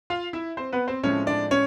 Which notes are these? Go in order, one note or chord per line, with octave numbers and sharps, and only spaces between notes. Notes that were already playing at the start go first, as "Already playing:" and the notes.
F4 F5
E4 E5
C4 C5
B3 B4
C4 C5
A2 F3 G#3 C4 C#4 C#5
D4 D5
C#4 C#5